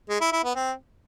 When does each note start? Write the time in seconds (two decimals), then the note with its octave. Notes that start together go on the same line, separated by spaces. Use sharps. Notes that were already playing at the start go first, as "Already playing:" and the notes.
0.09 G#3
0.21 E4
0.32 E4
0.44 B3
0.55 C4